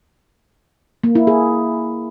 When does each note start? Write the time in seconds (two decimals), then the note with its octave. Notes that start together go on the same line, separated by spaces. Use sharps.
1.04 A#3
1.15 E4
1.27 G#4